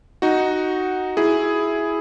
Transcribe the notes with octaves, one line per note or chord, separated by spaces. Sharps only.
D#4 F#4
E4 G#4